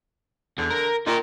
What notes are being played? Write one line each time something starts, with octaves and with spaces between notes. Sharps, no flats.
E2 D3
A#4
A#2 D#4 A#4